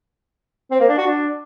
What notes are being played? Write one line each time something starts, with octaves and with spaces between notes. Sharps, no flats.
C4
A#3
D4
F#4
D4